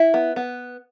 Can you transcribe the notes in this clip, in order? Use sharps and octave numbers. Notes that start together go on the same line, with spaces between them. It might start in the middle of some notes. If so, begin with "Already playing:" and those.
Already playing: E4
B3
B3